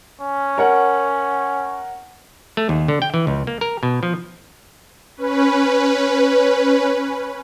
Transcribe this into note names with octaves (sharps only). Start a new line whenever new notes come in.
C#4
A#4 C#5 F#5
A3
D#2
D3
G5
E3
C#2
A#3
A#4
B2
F3
C#4 B4